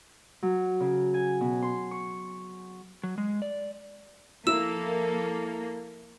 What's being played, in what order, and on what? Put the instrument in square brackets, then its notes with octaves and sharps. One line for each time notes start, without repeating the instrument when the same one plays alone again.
[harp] F#3
C#3
G#5
B2
C6
C#6
[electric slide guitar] F#3
G#3
D5
[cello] F3 A4 [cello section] A#3 [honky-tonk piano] E4 [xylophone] E6 E7